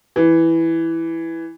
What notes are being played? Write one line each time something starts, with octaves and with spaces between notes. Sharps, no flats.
E3